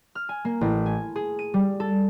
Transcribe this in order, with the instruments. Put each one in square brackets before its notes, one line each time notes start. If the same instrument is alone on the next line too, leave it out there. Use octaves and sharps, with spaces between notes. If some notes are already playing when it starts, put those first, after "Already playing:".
[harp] F6
G#5
A#3
A1
G#5
G#4
D#7
G3
A4